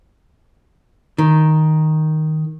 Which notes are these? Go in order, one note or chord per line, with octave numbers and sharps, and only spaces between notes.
D#3